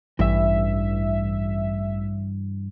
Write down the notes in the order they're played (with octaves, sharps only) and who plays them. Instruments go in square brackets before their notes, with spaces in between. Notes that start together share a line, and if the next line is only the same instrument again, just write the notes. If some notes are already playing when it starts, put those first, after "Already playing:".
[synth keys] A1 E5 [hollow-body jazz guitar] G2 E3